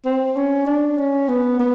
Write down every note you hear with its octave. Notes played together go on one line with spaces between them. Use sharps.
C4
C#4
D4
C#4
B3
B3